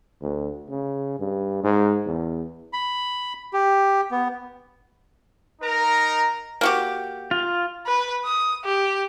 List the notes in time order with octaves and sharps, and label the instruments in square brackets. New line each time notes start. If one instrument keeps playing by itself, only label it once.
[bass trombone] D2
C#3
G2
G#2
E2
[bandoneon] B5
G4
B3
[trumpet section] D#4 A#4 A#5
[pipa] A#3 F#4 G4
[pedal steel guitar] F4
[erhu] B4
D#6
G4